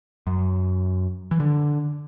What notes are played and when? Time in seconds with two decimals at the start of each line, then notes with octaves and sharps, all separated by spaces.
0.27 F#2
1.31 E3
1.40 D3